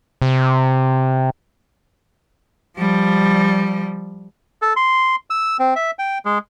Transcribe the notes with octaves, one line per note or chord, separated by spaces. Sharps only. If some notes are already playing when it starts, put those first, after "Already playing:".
C3
F3 G3
A4
C6
E6
C4
E5
G5
G#3